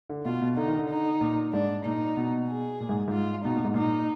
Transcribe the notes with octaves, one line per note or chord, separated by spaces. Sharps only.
D3
B2 F4
B2
D3 D#4
D#3
D3
D#4
A#2
G#2 D4
A#2 D#4
B2
G#4
A#2
G#2
G#2 F4
B2 D#4
A#2
G#2
A#2 D#4